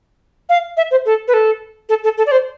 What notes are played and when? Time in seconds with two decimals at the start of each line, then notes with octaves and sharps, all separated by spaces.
0.49 F5
0.77 E5
0.91 C5
1.05 A4
1.28 B4
1.34 A4
1.89 A4
2.04 A4
2.18 A4
2.27 D5
2.32 C5